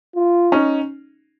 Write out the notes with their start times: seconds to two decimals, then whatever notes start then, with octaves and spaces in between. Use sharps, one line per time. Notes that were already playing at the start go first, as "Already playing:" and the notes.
0.16 F4
0.52 C#4 D#4